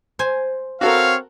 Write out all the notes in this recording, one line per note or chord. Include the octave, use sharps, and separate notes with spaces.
C5 G#5
C4 F#4 A4 A#4 C#5 F5